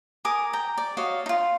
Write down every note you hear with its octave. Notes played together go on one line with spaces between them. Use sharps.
A#4 G#5 D6 D#6
G5 A#5
D5
F#4 C#5 D#5 F5
D#4 F4